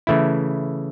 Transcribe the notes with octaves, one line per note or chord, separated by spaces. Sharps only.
C#3 E3 A3 E4